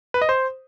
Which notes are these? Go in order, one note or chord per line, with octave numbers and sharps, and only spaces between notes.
B4
D#5
C5